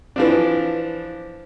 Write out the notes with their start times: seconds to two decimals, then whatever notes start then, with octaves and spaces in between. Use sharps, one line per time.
0.16 E3 F3 D4